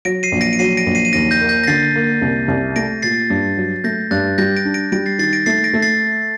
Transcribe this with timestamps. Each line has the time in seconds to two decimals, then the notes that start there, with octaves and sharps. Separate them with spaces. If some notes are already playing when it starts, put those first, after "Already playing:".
0.05 F#3 A#6 D7
0.23 C7 D#7
0.32 A#1
0.41 A#6 D7
0.53 D7
0.59 F#3 C7 D#7
0.77 A#6 D7
0.86 A#1
0.95 C7 D#7
1.05 D#7
1.13 D#2 A#6 D7
1.31 G6 A#6
1.41 A#3
1.49 G6 A#6
1.64 A#6
1.67 D3 A6 C7
1.95 A#3
2.22 C2
2.48 C2
2.76 A3 A#6 D7
3.02 A#2 A6 C7
3.30 G2
3.57 F#3
3.84 A3 G6 A#6
4.11 G2 F#6 A6
4.38 G3 G6 A#6
4.56 A#6 D7
4.65 D4
4.74 A#6 D7
4.92 G3 A#6 D7
5.06 A6 C7
5.19 D#3 A6 C7
5.33 A#6 D7
5.46 A3 A6 C7
5.64 A#6 D7
5.73 A3
5.82 A6 C7